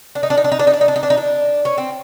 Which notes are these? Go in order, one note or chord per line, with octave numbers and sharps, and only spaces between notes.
D4
D#4
D4
D#4
D4
D#4
D4
D#4
D4
D#4
D4
D#4
D4
D#4
D4
C#4
C4